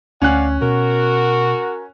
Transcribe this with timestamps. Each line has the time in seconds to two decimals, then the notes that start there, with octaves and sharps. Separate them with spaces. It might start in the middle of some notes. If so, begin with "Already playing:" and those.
0.22 D2 C#4 D5 F5 F#5 G#5 F#6
0.62 B2 F#4 A#4